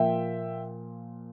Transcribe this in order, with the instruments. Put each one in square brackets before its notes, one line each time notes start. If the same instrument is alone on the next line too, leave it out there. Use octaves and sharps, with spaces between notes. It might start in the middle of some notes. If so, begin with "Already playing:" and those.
Already playing: [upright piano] A#2 F3 A#3 E5 G5